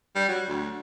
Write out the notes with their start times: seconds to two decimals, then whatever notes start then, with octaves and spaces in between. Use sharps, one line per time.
0.15 G3
0.28 F#3
0.48 D2